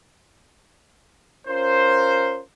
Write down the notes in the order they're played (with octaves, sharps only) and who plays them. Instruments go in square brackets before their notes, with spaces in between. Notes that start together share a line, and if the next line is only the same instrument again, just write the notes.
[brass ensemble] C#4 F4 A#4 C5